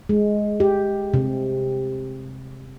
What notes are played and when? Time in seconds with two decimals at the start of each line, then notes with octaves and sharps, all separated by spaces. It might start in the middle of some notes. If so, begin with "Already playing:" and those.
0.09 G#3
0.60 G4
1.14 C3